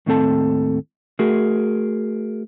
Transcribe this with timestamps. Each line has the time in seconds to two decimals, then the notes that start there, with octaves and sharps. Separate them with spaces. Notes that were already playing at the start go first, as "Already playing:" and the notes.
0.06 D#2 A2 C4 A4 A5
1.19 A3 F#4 G#4 A#4